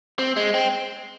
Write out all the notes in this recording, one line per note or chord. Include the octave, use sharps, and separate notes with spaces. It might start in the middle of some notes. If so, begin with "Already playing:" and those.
C4
G#3
C4